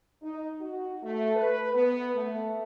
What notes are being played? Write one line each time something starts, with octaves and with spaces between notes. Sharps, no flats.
D#4
F#4
A3
B4
B3
A3